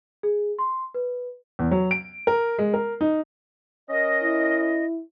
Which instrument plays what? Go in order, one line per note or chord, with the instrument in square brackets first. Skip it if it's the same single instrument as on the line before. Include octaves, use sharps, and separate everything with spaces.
[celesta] G#4
C6
B4
[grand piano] E2
F#3
D7
A#4
G#3
A#4
D#4
[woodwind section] C#4 A#4 D#5
[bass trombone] E4